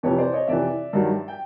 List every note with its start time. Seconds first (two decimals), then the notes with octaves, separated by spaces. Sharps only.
0.03 F2 C3 E3 B4 C#5
0.18 C5 D5
0.33 C#5 D#5
0.48 F2 C3 E3 D5 E5
0.93 G2 D#3 F#3
1.28 G5